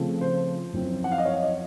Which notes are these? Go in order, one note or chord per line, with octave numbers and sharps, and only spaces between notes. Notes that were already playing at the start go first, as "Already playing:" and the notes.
Already playing: C#3 F3 A3 C4
C5
F#2 F3 C4
F#5
F5
D#5
C#5
D#5